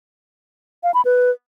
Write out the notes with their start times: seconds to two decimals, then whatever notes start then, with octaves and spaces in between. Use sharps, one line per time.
0.84 F5
0.94 B5
1.05 B4